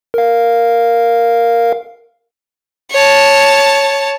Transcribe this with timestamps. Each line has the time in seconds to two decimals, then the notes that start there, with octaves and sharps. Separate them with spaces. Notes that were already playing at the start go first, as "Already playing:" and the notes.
0.14 A#4 F5
2.91 C#5 A5